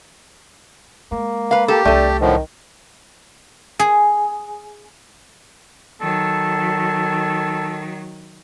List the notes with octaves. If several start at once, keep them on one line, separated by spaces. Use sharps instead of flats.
G#3 A#3
B4 F5
G4 A4
C2 F#3 A3 D4 A4
A2 D3 D#3 F3
G#4
D#3 F#3 A4